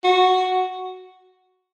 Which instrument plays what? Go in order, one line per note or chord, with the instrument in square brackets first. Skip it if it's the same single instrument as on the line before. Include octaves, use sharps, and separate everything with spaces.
[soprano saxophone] F#4